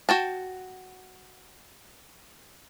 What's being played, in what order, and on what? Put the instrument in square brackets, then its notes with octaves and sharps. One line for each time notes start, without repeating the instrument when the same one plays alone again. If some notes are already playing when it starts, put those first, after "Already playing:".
[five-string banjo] F#4 G5 A5